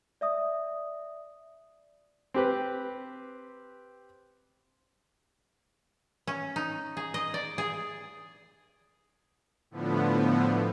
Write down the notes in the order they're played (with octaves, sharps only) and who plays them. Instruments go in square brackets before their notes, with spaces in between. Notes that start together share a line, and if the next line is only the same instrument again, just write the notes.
[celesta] D5 E5 D#6
[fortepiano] C4 G4 B4
[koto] C#4
D#4
G#4
D#5
D5
G#4
[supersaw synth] A2 D3 F3 B3